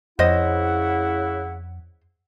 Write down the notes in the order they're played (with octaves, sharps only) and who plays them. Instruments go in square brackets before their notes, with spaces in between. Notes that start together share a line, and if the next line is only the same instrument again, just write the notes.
[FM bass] F2 [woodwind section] C#3 E4 F#5 [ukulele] C5 D#5